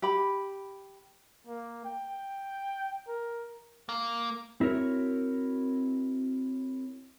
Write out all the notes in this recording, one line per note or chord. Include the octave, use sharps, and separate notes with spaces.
G4 B5
A#3
G5
A#4
A#3
C4 E4 F#4 A#4 C#5